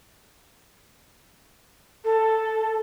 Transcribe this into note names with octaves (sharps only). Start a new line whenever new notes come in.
A4